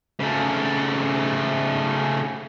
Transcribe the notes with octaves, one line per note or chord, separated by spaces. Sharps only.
C#3 A3